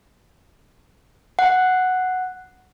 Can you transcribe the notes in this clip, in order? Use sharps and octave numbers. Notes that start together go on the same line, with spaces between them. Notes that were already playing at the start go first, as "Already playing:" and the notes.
F#5